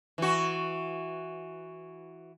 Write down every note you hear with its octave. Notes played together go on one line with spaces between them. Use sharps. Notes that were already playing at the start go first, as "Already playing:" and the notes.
E3 F#4